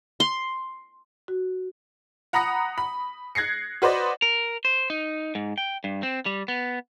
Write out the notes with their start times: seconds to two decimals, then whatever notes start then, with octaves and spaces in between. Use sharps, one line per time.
0.20 C6
1.28 F#4
2.33 F#5 A#5 B5 D#6 A#6 C#7
2.78 B5
3.35 F#6 G#6 A#6 C7 C#7
3.82 F#4 B4 C5 D5 D#5
4.22 A#4
4.65 C5
4.90 D#4
5.35 G#2
5.58 G5
5.84 G2
6.03 C4
6.26 G3
6.48 B3